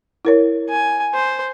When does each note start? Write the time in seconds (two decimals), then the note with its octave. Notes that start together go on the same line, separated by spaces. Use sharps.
0.25 E4 A#4 C#5
0.70 G#5
1.14 C5